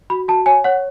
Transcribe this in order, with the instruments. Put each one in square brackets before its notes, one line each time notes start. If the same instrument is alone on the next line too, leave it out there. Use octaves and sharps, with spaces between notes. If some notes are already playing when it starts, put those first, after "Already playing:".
[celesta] F#4 B5
F#4 A5
C#5 G#5
C#5 F#5